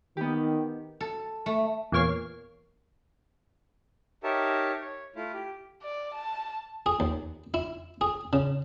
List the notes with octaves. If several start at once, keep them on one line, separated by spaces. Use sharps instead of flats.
D#3 B3 G4
A4
A3
E2 A#2 A#3 C#5 C7
D#4 G4 A#4 C#5 E5 A5
C#5
A3 E4 F4
G4
D5
A5
G#4
D#2
E4
G#4
C#3